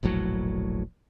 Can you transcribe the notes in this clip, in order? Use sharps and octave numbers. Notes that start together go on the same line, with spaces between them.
E1 A#1 A2 F#3